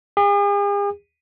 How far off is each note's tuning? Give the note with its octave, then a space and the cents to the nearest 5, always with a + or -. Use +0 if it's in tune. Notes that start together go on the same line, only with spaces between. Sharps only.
G#4 -45